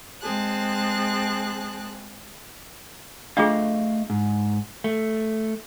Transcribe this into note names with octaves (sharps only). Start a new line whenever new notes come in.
G#3 C4 G#4 A5 F#6
A3 D4 F4 G#4 D#5 F5
G#2
A3